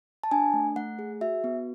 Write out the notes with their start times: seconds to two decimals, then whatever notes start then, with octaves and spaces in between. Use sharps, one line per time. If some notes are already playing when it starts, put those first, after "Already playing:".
0.23 A5
0.31 D4 G#5
0.54 A3
0.76 A3 F#5
0.99 G#4
1.21 F#4 E5
1.44 B3